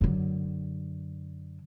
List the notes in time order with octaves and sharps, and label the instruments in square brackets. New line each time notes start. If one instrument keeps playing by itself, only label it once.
[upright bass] F#2 D3